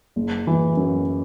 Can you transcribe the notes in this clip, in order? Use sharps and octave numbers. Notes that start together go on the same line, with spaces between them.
F#1
E3
F#2